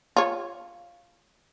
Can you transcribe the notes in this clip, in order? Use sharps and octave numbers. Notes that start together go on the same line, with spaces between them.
F4 C#5